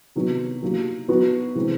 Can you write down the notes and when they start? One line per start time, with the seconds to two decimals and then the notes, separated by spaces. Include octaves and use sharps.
0.16 C3 D#3 F#3 B3 D#4
0.63 F#3 A#3 D#4 G4
1.08 F#3 B3 D#4 F#4 B4
1.55 C3 E3 G#3 C4